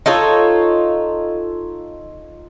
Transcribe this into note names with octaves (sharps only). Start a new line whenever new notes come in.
D#4 F4 A4 C#5